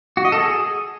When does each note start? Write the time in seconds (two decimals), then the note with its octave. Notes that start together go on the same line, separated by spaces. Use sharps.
0.17 F#4
0.25 D#5
0.32 A4
0.40 G#4